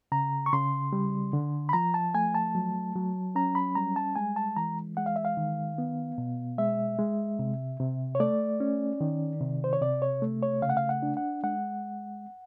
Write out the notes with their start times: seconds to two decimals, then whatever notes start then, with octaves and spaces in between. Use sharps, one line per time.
0.12 C#3 A#5
0.46 C#6
0.53 C#3 C6
0.93 G3
1.33 D3
1.69 B5
1.73 F3 A#5
1.94 A5
2.14 A3 G#5
2.35 A5
2.55 F#3
2.95 F#3
3.35 C#4 A#5
3.55 B5
3.75 G3 A#5
3.96 A5
4.16 G#3 G#5
4.36 A5
4.56 E3 A#5
4.97 G#3 F#5
5.06 F5
5.16 E5
5.25 F5
5.37 D#3
5.78 B3
6.18 B2
6.58 G#3 E5
6.99 G#3
7.39 C3
7.80 C3
8.15 C#5
8.20 A3 D5
8.60 C#4
9.01 D#3
9.41 C3
9.64 C5
9.73 C#5
9.81 C3 D5
10.02 C#5
10.22 A3
10.43 C#5
10.62 C#3 F5
10.69 F#5
10.77 F5
10.89 F#5
11.03 D4
11.17 F#5
11.43 G#3 F#5